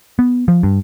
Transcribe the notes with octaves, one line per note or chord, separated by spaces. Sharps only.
B3
F3
G2